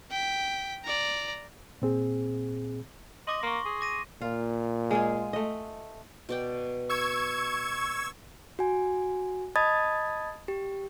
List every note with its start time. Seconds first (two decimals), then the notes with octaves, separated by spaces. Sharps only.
0.11 G5 B6
0.84 D5 A#5
1.82 A#2 C4 G#4
3.27 D#5 C6 D6 A#6
3.43 A#3 C6 C#6
3.65 G#4
3.81 D6 A#6 D#7
4.21 A#2 F4
4.91 G#3 F4 G#4
5.33 A3 D#5
6.29 B2 D5 G5
6.89 C#6 E6 G#6
8.59 F#4 G#5
9.56 D#5 A5 B5 D#6 G#6 A6
10.48 G4